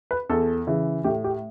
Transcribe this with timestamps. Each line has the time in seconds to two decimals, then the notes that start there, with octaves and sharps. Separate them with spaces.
0.11 B4
0.29 E2 A4
0.67 C#3 E3
1.04 A2 G4
1.24 G4